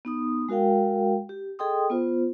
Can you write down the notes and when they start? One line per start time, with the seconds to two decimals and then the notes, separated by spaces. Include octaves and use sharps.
0.05 B3 D#4 D#6
0.49 G#3 F#4 A#4 F5 G5
1.29 G4
1.59 G#4 A4 D#5 G5 C6 D#6
1.90 B3 F4 C5